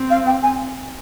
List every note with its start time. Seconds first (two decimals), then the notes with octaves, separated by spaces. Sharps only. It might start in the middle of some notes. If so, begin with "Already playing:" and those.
Already playing: C4
0.10 F5
0.26 G5
0.43 G#5